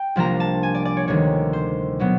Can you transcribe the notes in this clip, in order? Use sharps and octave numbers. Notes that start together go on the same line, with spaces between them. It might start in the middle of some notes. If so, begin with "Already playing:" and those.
Already playing: G5
C2 C3 F3 A#3 D4 A#5
A5
G#5
D5
D5
C#5
D2 C3 D#3 G3 C#5
C5
B2 F#3 B3